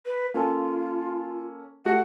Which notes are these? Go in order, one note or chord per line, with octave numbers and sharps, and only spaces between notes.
B4
A#3 C#4 F4 A4
A3 F#4 G4 F#5